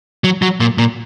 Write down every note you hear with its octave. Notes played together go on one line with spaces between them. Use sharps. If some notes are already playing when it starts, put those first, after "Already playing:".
F#3
F#3
A#2
A#2